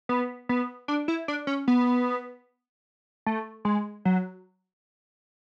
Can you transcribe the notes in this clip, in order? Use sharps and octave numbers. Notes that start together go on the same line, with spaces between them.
B3
B3
D4
E4
D4
C#4
B3
A3
G#3
F#3